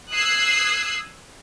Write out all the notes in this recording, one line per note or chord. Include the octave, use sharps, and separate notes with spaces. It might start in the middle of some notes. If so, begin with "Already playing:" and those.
D#6 E6 F#6 G#6 C7